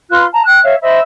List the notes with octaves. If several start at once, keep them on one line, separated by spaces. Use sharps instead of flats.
F4 B4 C6 F#6
A5 A#5
G5 F#6
C#5 E5 F5
C5 D#5 E5 B5